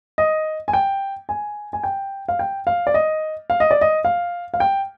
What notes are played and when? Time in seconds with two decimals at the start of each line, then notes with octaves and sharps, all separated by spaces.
0.18 D#5
0.68 G#5
0.73 G5
1.29 G#5
1.73 G#5
1.84 G5
2.29 F5
2.39 G5
2.67 F5
2.87 D5
2.94 D#5
3.50 F5
3.60 D#5
3.71 D5
3.81 D#5
4.05 F5
4.54 F5
4.60 G5